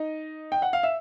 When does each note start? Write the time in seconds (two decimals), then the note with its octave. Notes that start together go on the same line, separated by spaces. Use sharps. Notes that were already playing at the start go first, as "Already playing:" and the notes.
Already playing: D#4 D#5
0.52 G5
0.62 F#5
0.73 F5
0.83 E5